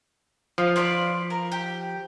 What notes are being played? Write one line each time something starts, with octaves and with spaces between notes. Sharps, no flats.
F3 F5
F4 B4 D5
A#4
G4